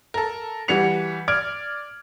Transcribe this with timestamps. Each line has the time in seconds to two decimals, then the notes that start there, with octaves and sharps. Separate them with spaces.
0.14 A4 A#4
0.68 E3 G3 F#4 C#7 F7
1.28 D5 F6 G#6 D7